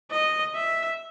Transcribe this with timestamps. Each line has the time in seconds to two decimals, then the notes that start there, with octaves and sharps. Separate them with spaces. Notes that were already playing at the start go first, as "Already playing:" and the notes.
0.11 D#5
0.55 E5